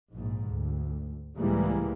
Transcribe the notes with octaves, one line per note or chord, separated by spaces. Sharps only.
A#1 G#2
D2
C#2 A2 E3 G3 G#3 A#3